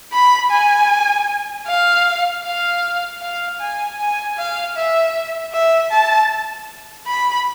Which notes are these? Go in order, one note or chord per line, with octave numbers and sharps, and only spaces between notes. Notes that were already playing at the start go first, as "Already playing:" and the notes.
B5
G#5
F5
F5
F5
G#5
G#5
F5
E5
E5
A5
B5